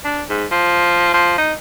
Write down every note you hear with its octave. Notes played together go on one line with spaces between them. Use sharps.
D4
G#2
F3
F3
D#4